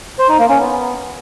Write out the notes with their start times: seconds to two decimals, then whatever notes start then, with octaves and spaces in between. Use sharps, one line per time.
0.19 C5
0.29 D#4
0.39 A#3
0.49 C#4
0.59 B3